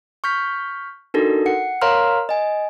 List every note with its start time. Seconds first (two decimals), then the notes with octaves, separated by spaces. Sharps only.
0.24 C#6 F6 G6 B6
1.14 D4 D#4 F#4 A4 A#4
1.46 F#5 C#7
1.82 A#4 C#5 F5 A#5 C6 F6
2.29 D#5 G#5